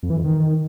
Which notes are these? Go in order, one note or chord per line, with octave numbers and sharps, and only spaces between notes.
F2
E3
F2
D#3